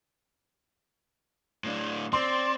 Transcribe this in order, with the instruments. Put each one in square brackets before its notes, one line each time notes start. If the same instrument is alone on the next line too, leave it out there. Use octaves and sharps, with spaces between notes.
[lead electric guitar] A2 D4
[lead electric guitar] C4 [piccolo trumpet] D5 [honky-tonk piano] C6